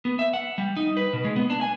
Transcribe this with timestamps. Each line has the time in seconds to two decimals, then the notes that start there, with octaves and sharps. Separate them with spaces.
0.05 B3
0.19 E5
0.34 F#5
0.58 G3
0.77 D#4
0.97 B4
1.13 B2
1.25 G#3
1.36 B3
1.50 D4
1.61 G#5